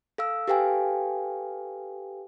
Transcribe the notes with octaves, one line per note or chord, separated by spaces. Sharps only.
A4 F5 E6
G4 A4 B4 F5 G5 G#5